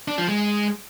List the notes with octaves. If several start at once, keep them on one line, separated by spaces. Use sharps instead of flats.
D4
F3
G#3